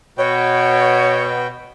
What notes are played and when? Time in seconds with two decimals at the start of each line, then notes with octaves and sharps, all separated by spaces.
0.18 B2 F#4 B4 C#5 G5